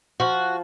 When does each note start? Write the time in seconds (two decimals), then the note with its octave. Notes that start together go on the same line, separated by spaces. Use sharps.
0.20 F3 F#4